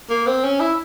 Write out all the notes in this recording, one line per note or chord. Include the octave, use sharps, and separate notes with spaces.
A#3
C4
C#4
E4